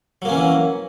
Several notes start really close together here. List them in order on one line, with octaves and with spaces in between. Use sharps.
F#3 A#3 C#4 E3